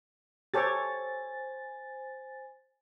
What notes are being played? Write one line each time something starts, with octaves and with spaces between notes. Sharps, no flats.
G4 A4 C5 C#5 G#5 A6